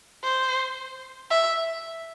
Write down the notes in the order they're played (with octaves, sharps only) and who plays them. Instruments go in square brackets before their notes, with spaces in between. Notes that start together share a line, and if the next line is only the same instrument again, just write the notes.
[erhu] C5
E5